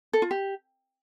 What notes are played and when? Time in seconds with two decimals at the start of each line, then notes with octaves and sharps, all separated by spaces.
0.13 A4
0.22 F4
0.31 G4